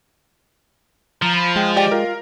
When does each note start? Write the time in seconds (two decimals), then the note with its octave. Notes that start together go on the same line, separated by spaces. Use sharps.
1.22 F3 A#5
1.35 B5
1.56 G#3 G5
1.77 G4 D5 G5 D6
1.92 F4 A#4